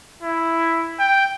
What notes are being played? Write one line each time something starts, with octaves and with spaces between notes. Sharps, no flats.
E4
G5